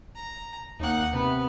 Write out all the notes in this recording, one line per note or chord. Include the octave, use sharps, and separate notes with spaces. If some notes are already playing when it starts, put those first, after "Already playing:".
A#5
D#2 A#3 D#4 F#5
C3 B3